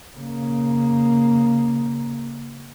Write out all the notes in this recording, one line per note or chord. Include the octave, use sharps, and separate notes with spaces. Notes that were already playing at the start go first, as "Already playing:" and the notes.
C#3 A#3